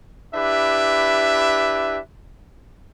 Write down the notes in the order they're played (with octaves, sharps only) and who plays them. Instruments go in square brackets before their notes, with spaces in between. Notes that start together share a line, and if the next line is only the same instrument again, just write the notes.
[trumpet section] D4 E4 G4 B4 E5